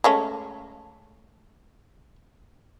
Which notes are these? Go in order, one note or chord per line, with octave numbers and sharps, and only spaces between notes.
G#3 A3 C#4